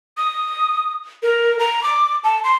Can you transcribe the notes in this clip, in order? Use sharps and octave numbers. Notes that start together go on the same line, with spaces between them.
D#6
A#4
A#5
D6
A5
C6